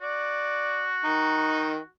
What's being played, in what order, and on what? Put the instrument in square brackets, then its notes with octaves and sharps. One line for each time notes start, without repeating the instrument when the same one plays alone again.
[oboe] F#4 [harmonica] D5
[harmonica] D#3 D#4